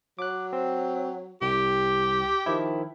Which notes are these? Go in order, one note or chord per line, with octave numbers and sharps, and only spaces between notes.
F#3 D6 F#6
C4
C2 G4
D#3 F3 E4